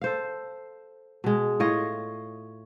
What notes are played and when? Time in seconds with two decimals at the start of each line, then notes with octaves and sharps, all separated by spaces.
0.02 A4 C5 F5
1.24 B2 G#3
1.60 A2 F4 C#5 D#5